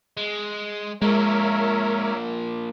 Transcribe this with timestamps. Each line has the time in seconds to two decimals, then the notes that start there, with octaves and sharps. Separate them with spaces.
0.17 G#3
1.02 F3 G#3 A#3 A#4 C#5 E5